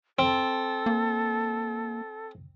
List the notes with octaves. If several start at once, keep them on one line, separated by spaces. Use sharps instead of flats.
C4 A4
A#3